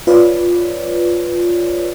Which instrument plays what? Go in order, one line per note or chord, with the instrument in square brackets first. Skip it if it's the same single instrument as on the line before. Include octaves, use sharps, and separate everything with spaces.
[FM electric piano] F4 B4 C#5 D5